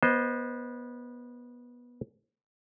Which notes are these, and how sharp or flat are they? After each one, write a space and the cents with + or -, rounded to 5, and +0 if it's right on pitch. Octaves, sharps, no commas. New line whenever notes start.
B3 -20 C5 +0 D#5 +0